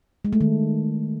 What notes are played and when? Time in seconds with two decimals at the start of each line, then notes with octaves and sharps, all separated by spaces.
0.25 G#3
0.33 A3
0.41 D#3